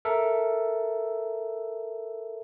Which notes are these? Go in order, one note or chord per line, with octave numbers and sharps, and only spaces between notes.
A4 A#4 E5